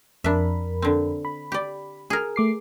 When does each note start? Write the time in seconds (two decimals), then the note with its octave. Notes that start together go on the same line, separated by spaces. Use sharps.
0.24 F2 D4 A#4 E5 B5
0.82 D3 C4
1.25 B5
1.52 G4 D5
2.10 G#4 A#4
2.36 A3 D6 C7